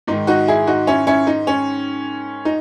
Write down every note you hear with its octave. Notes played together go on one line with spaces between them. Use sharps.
G#2 D#3 D#4
D#4 F#4
E4 G#4
D#4 F#4
C#4 E4
C#4 E4
D#4
C#4
D#4